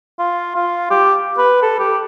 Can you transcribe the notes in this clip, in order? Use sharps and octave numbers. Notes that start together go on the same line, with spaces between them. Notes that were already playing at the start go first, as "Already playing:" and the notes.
F4
F4
G4
B4
A4
G4